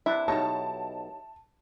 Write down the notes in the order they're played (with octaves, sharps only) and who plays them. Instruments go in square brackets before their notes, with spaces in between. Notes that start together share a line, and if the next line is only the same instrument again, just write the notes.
[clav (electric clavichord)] C3 D4 B4 [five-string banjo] E4
[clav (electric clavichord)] B1 B2 D#5 [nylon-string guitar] D#4 G4 C#5 [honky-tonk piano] A5